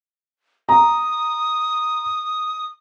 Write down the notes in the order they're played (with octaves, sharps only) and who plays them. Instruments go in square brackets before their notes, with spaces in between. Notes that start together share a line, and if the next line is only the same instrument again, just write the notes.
[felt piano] A#5 [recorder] D#6